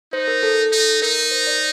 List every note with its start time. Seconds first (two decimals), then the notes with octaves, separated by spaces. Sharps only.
0.13 D#4 C5
0.28 A#4
0.43 A4
0.72 D#4
1.02 D#4 A#4
1.20 A#4
1.31 C5
1.47 D5